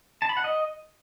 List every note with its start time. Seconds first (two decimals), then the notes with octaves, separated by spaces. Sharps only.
0.22 A5
0.29 B5
0.37 F#5
0.44 D#5